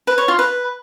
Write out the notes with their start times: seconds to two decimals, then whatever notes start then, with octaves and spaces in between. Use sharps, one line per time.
0.07 B4
0.18 C#5
0.28 F4
0.39 B4